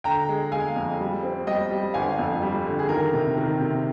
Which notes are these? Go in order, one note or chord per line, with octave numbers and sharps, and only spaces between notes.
D3 G5 A#5
G#3
G#3 F5 G#5
F2
G3
C4
G3 D#5 G5
G3
G1 F5 G#5
F2
G3
D3
G#4
D#3 A#4
C3
D#3 A#4
C3